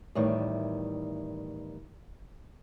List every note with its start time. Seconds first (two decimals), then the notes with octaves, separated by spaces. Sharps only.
0.15 E2 A2 D#3 G3